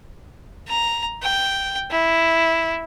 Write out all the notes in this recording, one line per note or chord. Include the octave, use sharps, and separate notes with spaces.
A#5
G5
E4